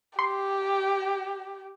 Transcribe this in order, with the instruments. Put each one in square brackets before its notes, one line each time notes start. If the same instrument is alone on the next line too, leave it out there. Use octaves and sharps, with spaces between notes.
[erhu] G4 [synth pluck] C6